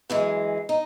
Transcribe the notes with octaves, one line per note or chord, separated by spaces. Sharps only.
F#2 E3 G#3
D#4